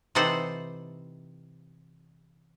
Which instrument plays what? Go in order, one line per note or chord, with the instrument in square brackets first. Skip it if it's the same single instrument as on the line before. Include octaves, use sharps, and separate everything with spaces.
[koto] C3 E3 D#4 A4 C5 F#5